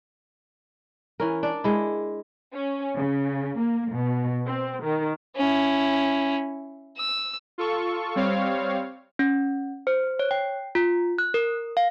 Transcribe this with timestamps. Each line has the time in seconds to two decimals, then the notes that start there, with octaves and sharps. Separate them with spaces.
1.20 E3 C#4 A#4
1.43 D4 D5
1.64 G#3 E4
2.53 C#4
2.95 C#3
3.59 A#3
3.93 B2
4.46 C4
4.83 D#3
5.36 C#4 E4
6.98 E6
7.58 F4 A4 C#6
8.16 G3 C4 C#5 F5
9.19 C#4
9.87 C5
10.19 C#5
10.31 G5
10.75 F4
11.18 F#6
11.34 A#4
11.77 F5